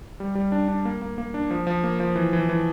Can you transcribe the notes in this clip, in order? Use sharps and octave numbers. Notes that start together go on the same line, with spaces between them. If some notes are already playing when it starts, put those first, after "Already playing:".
G3
G3
D4
D4
A#3
A#3
A#3
D4
F3
F3
A#3
F3
E3
E3
E3